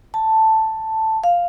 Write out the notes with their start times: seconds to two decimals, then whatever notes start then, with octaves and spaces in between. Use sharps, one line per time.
0.14 A5
1.24 F5